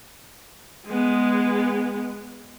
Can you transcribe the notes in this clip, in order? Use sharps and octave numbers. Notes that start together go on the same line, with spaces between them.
G#3 B3